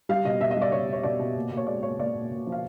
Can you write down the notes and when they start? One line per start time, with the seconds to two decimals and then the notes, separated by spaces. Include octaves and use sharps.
0.09 G3 F5
0.25 B2 D#5
0.40 B2 E5
0.51 D#5
0.57 G3
0.62 D5
0.72 B2 C#5
0.88 B2 C#5
1.03 B2 D5
1.19 B2
1.36 A#2
1.51 A#2
1.57 C#5
1.67 G#3 D5
1.83 A#2 C#5
1.98 A#2 D5
2.15 A#2
2.30 A#2
2.47 F3
2.52 F5